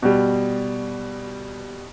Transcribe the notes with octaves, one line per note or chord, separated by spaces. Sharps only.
B2 G3